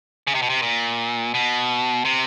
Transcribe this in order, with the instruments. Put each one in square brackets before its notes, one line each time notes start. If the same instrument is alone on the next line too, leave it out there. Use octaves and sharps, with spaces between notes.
[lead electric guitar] C#3
C3
B2
C3
A#2
B2
C3